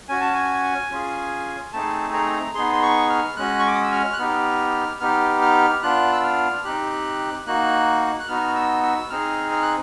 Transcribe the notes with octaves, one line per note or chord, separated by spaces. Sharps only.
C#4 F#4 G#5
A5
G#5
C#4 F4 G#4
A3 C4 D#4 G#4 A5
A#5
B3 D#4 G#4 C6
C6
C#6
F6
G#3 C#4 F#4 F#6
C#6
D6
D#6
E6
F6
F#6
B3 D#4 G4 F6
B3 D#4 G4 F6
F6
B3 D4 F4 F#6
E6
F6
C4 D#4 G4 F#6
A#3 D#4 F#4 F#6
F#6
B3 D#4 F#4 F6
E6
E6
C4 D#4 G#4 F6
F6
F#6